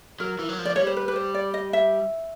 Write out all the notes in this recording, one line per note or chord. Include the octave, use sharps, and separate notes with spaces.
F#3 A#4
E3
F#3
F3
D5
G3 C#5
C5
B4
B4
C5
D5
D#5
E5